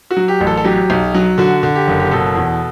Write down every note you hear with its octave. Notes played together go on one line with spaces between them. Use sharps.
F#4
F#3
G4
A1
A4
A4
F#3 G4
B1
F#3
D3 F#4
D3
G4
F#1
G4
B2 A4
E2